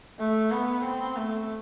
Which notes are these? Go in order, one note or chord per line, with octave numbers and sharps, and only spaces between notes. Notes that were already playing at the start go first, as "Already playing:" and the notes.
A3
B3
C4
A3